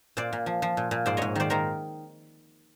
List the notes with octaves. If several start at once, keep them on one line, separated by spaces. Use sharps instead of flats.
A#2 C5 D5
A#2
F3
F3
A#2
A#2
G#2 C5 D5
G#2 C#5 D#5
D#3 C5 D5
D#3 A#4 C5